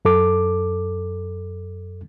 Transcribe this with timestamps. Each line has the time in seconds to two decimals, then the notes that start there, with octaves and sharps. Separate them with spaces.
0.05 F#2 A4 D6